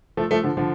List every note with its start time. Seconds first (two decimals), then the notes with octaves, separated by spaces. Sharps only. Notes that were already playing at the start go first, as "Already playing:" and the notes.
0.17 F3 A3
0.31 F3 A3
0.44 D3 F3
0.57 D3 F3